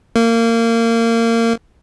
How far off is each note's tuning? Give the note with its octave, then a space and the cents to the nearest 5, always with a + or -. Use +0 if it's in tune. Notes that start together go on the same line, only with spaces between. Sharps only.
A#3 -25